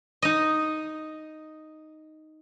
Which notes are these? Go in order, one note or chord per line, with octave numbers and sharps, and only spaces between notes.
D#4 D#5